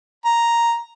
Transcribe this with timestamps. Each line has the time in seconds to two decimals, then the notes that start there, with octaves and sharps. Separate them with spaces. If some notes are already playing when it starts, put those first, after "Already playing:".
0.25 A#5